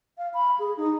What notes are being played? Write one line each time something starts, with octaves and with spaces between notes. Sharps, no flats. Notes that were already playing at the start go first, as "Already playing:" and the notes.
F5
B5
G#4
D#4